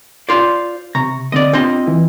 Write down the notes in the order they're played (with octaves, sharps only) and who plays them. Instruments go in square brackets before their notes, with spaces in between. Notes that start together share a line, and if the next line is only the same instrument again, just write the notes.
[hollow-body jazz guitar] F4 C5 D5
[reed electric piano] C3 C#6 [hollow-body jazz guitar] A#5
[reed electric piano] D3 C4 [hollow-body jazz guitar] D5 D#5
[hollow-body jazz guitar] C4 F4 D#5 [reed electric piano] D4
[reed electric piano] E3 E4